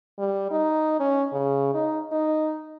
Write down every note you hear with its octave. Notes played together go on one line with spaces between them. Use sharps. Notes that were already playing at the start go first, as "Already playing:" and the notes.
G3
D#4
C#4
C#3
D#4
D#4